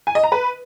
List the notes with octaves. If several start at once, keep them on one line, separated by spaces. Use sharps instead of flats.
G#5
D#5
A#5
B4